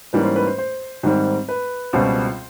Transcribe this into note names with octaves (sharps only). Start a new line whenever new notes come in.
G#2 E3 G3 A#3 C#4 B4
C5
B4
C5
C5
G#2 D#3 G3 C4
B4
C#2 B2 G3 C4 C5